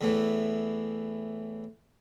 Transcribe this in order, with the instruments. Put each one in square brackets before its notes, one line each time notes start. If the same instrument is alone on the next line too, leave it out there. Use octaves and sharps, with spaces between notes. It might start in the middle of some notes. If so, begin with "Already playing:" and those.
[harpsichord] E2 A2 E3